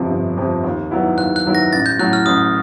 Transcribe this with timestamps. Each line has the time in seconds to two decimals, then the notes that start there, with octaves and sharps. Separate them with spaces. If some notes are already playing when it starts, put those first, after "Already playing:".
Already playing: G1 F2 C3 F3
0.11 G1
0.37 F2 C3 F3
0.64 D#2
0.91 D#3 F#3 B3 E4
1.18 D#2 F#6
1.36 F#6
1.45 D#3 F#3 B3 E4
1.55 A#6
1.73 A1 A6
1.86 G6
1.99 A2 F#3 F#6
2.13 F6
2.26 A1 D#6